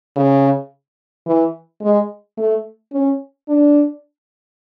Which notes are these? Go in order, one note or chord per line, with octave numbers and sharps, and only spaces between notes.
C#3
E3
G#3
A3
C#4
D4